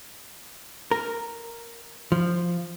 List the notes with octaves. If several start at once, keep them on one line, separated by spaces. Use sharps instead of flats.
A#4
F3